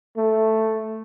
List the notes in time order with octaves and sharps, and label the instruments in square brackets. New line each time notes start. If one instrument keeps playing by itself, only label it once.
[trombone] A3